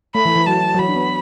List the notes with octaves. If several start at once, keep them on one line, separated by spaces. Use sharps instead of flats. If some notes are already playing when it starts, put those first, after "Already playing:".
A3 B5
E3
E3
F#3 A5
F#3
E3 B5
D4
B3